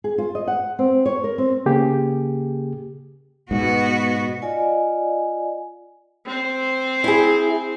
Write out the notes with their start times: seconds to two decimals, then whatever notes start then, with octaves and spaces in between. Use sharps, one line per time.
0.04 G#4
0.18 F4
0.35 D#5
0.48 F#5
0.79 C4
1.06 C#5
1.24 A#4
1.38 C4
1.66 C#3 A#3 G4 G#4
3.51 G#2 B2 B3 F#4
4.42 F4 D5 D#5 F5 G#5
6.25 C4 C5
7.04 E4 G#4